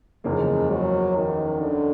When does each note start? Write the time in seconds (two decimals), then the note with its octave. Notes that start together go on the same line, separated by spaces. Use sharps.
0.24 F#1 E2 C#3 F3 G#3 A#3
0.70 F#3
1.16 D#3
1.61 D3